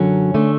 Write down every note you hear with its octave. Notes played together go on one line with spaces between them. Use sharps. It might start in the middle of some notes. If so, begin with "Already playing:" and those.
Already playing: F#2 D3 F#3 C#4
D3 A3